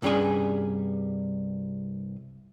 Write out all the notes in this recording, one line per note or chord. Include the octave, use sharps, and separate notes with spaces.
C2 G2 G3 C#4 G#4 G#5